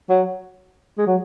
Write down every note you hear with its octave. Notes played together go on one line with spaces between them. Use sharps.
F#3
G#3
F#3